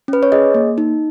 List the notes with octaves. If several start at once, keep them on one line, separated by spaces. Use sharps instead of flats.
C#4 B4
C#5
G#4 D#5
A#3
D#4